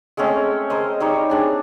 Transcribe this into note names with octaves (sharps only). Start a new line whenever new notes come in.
G#3 A3 C4 C#4
G#3 A#4 C5 D#5
G3 D#4 C#5
C4 D4 G#4